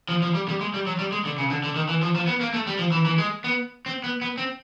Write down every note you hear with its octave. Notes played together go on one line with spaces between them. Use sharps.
F3
F3
G3
G3
G#3
G3
F#3
G3
G#3
D3
C#3
D3
D3
D#3
E3
F3
F3
B3
A#3
A3
G3
F3
E3
E3
G#3
B3
C4
B3
B3
C4